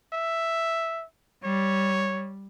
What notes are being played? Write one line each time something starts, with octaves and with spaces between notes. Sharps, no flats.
E5
G3 C#5